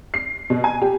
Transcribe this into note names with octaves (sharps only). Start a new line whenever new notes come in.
C7
B2
G#5
G4